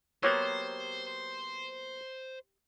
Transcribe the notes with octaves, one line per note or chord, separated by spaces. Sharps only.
F#3 A#3 B3 G4 C5 C#5